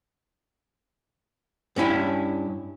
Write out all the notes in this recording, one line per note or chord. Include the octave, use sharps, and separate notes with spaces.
G2 C#4 E4 G#5